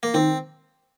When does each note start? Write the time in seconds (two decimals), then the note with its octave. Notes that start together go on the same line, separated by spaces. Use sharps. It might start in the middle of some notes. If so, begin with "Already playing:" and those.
0.03 A#3
0.14 D#3 C4